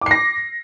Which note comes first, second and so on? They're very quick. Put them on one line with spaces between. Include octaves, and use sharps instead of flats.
D6 C7 A#6